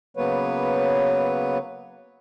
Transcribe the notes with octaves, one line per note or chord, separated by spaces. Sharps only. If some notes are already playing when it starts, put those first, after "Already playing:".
C#3 F#3 A#3 B3 B4 C#5